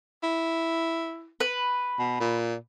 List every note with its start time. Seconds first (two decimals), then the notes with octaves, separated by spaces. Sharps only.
0.23 E4
1.40 B4
1.99 B2
2.20 A#2